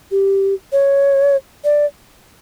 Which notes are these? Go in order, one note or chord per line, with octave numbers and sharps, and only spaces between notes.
G4
C#5
D5